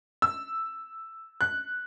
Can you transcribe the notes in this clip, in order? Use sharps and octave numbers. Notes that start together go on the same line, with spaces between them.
E6
F#6